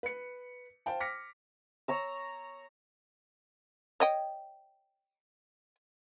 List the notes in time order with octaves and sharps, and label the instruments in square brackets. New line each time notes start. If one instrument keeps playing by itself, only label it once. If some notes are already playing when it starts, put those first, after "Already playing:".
[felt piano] B4 C#7
C5 F5 G5 A5
D6 F6 A#6 B6 C#7
[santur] C#5 A#5 E6
[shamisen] C#5 D#5 G5